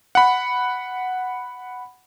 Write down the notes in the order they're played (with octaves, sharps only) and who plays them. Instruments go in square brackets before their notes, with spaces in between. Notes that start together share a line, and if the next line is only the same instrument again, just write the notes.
[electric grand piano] F#5 B5